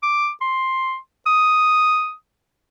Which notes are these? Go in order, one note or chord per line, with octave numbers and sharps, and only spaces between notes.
D6
C6
D#6